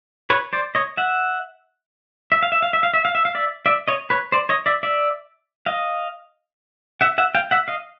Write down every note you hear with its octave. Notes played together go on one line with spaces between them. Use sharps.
B4 C#5
C5 D5
C#5 D#5
E5 F#5
E5
F5
E5
F5
E5
F5
E5
F5
E5
F5
D5 E5
D5 E5
C#5 D#5
B4 C#5
C5 D5
C#5 D#5
D5 E5
D5 E5
D#5 F5
E5 F#5
E5 F#5
F5 G5
E5 F#5
D#5 F5